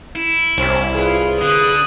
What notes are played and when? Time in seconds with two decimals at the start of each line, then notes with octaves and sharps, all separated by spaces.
0.15 E4
0.58 C2 B2 C4 C#4
0.95 F4 G#4 B4
1.41 D3 D#6 F#6